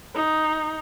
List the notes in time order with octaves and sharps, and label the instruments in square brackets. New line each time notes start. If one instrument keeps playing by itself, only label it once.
[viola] D#4